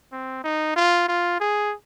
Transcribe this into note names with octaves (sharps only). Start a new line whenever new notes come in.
C4
D#4
F4
F4
G#4